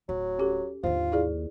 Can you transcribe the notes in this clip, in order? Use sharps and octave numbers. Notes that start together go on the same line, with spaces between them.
D1 F#3
C#4 G4 A4
D#2 G#2 D3 F4 C5
E4 G#4 D5